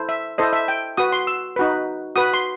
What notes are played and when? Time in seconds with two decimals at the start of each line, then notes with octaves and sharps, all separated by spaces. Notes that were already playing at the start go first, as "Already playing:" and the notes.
Already playing: E4 A4 C5
0.09 E5
0.38 E4 A4 C5 D#5
0.53 E5
0.68 G5
0.97 F#4 B4 D#6
1.12 C6
1.27 E6
1.56 D#4 F#4 B4
2.16 F#4 B4 D#6
2.34 C6